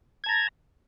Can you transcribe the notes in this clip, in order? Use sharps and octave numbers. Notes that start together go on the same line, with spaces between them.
A5 A#5 G#6